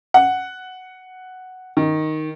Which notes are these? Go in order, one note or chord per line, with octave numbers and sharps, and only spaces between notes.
F#5
D#3